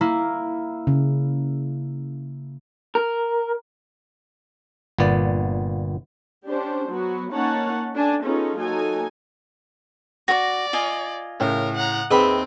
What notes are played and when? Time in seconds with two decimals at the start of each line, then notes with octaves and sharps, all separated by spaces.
0.01 A#3 E4
0.87 C#3
2.95 A#4
4.99 G1 A#2 B3 D5
6.47 C#4 D4 G4 C5
6.90 F#3 B3 F#4
7.32 A#3 C#4 D#4 C#5 F#5 A5
7.95 D4 A4 G#5 A5
8.25 B3 C#4 D#4 F4 G#4 A4
8.58 F#3 A#3 D#4 A4 G#5
10.28 F#4 D5 A#6
10.73 F4 D#5 G#5
11.40 A2 C#3 A#4
11.76 F#5 A#5
12.10 D#2 C4 G#4 B4 D#5 E5 G5 B5